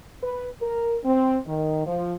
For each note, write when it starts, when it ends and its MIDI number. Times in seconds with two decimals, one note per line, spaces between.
0.23 0.50 71
0.62 0.96 70
1.04 1.38 60
1.46 1.84 51
1.86 2.15 53